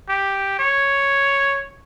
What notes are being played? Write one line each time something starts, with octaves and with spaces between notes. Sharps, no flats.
G4
C#5